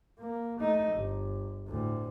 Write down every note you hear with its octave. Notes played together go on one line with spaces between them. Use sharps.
A#3
A3 D#4
G1
D2 A2